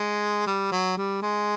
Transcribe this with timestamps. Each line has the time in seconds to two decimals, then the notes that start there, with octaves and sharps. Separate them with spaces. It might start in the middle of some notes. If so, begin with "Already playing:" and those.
Already playing: G#3
0.47 G3
0.72 F#3
0.97 G3
1.22 G#3